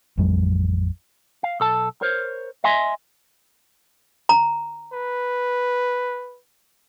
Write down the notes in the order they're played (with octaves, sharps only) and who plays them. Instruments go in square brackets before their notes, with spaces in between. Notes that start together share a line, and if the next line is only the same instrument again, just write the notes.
[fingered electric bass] A1 F2 F#3 G#3
[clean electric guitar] F5
B1 A4 A5
A#4 C5 C#5
D#5 E5 G#5 C6
[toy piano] A#5
[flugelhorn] B4